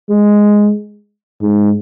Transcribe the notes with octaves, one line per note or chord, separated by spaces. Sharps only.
G#3
G#2